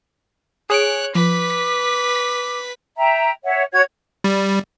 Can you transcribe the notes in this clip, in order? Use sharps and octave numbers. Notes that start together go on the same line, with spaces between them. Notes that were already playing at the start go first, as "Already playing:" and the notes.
G#4 C#5 F#6 D7
F3 B4 D6 B6
E5 G5 A#5
C#5 E5 F#5
F#4 C#5 F#5 G#6
G3